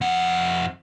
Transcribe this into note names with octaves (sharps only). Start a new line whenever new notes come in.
F2 F#5